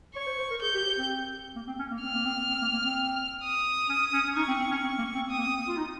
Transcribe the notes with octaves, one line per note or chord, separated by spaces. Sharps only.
C#5 C#6
C5
C5
A#4
G#4 G6
G4
G4
C4
A#3
C4
C#4
A#3
C4 F6
A#3
C4
C4
A#3
A#3
C4
D#6
C#4
C#4
C#4
D#4 C#6
C4
C4
C#4
C4
A#3
C4
C4 D#6
A#3
C4
F4
D#4